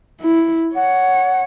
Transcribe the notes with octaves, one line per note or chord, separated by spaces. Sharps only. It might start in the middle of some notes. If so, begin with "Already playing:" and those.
E4
C#5 F#5